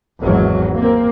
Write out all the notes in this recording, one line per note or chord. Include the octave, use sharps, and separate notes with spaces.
G#1 E2 G#2 F#3
A#3 C4